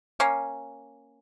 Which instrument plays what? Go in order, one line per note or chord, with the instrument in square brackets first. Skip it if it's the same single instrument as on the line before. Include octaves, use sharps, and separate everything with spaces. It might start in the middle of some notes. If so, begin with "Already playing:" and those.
[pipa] A#3 C#4